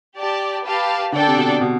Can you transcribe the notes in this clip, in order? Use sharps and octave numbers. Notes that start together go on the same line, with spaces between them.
G4 D5 A5
G4 B4 F5 A5
D3 D4 A4 D5 G5
C3
B2
B2